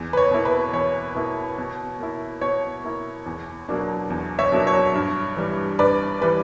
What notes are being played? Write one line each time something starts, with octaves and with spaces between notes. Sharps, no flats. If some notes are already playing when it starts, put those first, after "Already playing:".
Already playing: E2
B4
C#5
B2 A#3 E4
B4
E2 C#5
B2 A#3 E4
B2
A#3 E4
B2 C#5
A#3 E4
E2
B2 F#3 A#3 D4
E2
C#5 E5
B2 F#3 A#3 D4
C#5
G2
E3 G3
G2 B4 D5
E3 G3 B4